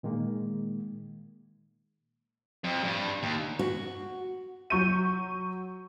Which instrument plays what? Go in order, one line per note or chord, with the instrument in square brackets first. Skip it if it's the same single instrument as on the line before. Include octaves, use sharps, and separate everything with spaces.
[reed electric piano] A#2 D#3 G#3 A#3
[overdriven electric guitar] F2
G2
D#2
[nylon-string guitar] F#4
[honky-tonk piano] F#3 C#6 G6 D#7